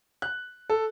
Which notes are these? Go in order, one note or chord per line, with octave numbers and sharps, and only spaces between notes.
F#6
A4